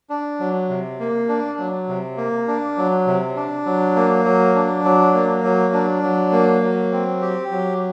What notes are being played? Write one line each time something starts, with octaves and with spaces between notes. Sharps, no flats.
D4
F#3
C3
A#3
D4
F#3
C3
A#3
D4
F#3
C3
D4
F#3
A#3
F#3
D4
F#3
A#3
F#3
D4
F#3
A#3
F#3
C4
G4
F#3